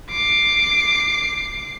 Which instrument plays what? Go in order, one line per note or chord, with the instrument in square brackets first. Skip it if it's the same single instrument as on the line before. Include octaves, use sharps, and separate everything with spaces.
[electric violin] D6 C7